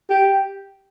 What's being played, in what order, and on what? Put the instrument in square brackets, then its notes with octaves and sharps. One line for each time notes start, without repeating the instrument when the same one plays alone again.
[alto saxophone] G4